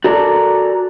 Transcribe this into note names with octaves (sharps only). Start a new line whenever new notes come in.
F#4 A4 A#4 D5